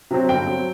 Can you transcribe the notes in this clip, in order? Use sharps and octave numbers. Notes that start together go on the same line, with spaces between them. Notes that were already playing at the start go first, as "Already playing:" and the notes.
C3 F#3 C4
G1 G5
F#3 C4